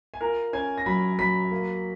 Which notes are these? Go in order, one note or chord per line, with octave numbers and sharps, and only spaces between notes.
G#5
F4 A#4 A#5
C#4 G#5 G#6
A#6
F#3 B5 B6
F#3 B5 B6
A#3